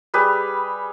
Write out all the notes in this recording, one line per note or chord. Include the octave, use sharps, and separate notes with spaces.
G3 G#4 B4